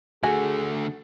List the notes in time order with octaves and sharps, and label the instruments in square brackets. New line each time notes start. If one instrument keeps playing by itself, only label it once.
[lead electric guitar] D3 A3 [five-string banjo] F#4 G#5 [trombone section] G#4